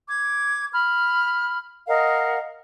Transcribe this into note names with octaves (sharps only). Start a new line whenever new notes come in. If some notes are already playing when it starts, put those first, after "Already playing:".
D6 G#6
B5 F6
A#4 D#5 F5 F#5